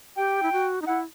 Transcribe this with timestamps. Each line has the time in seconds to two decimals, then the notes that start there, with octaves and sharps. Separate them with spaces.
0.17 G4 G5
0.43 E4
0.52 F#4
0.82 D#4
0.87 E4 F#5